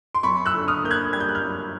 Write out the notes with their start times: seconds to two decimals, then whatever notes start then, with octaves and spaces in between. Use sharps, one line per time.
0.15 C6
0.23 F#2 B5 C#6
0.46 E6 F#6
0.53 D3
0.68 D#6 F6
0.83 A#3 G6
0.91 F#6 G#6
1.13 G3 G#6
1.20 G6
1.29 F#6
1.35 F6 G6
1.43 F#2